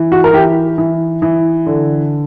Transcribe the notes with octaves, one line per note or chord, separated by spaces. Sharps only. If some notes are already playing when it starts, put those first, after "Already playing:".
Already playing: E3
F#4
A#4
E3 G4
E3
E3
D3